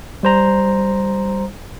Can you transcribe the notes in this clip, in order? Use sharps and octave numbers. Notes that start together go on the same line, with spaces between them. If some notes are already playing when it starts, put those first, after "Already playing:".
G3 C5 A#5